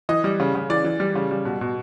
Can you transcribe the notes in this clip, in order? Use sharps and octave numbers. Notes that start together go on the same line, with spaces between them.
E3 D#5
G3
C#3
C#3
E3 D5
E3
G3
C#3
G3
B2
B2